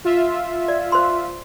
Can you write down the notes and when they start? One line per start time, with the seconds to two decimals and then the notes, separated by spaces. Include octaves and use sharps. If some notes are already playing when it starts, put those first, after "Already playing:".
0.05 F4 E5
0.68 D5
0.92 C5 C6